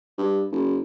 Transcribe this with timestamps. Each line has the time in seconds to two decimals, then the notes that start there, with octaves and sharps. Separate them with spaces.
0.18 G2
0.52 F#1